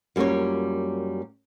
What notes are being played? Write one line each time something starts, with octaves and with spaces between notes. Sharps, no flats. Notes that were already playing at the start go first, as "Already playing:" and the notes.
F#2 G3 A#3 F4 C#5